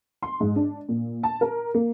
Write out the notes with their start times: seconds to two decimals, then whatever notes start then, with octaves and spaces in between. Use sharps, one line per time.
0.23 C6
0.40 G#2
0.56 D4
0.89 A#2
1.23 A5
1.41 A#4
1.74 A#3